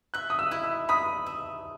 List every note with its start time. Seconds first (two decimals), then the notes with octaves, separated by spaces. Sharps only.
0.14 E5 F#6
0.30 D#6
0.39 E6
0.51 E4
0.63 E6
0.89 B5 D#6
1.27 E5